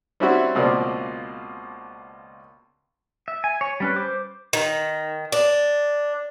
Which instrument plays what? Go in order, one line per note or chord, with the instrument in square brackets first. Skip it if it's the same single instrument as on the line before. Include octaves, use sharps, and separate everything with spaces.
[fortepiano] G3 C4 C#4 E4 F#4
C#2 B2 F3 A#3 C4 D5
[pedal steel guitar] E5
G#5
C#5
G3 C#4 B4
C5 D6
[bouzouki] D#3
D4